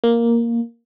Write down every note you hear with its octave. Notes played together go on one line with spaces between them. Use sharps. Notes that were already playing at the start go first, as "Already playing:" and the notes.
A#3